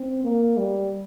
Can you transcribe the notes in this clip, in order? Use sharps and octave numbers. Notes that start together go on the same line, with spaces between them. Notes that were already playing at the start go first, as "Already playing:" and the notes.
Already playing: C4
A#3
G3